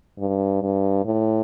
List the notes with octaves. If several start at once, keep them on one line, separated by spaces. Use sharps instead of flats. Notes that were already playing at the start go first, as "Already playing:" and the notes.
G2
G2
A2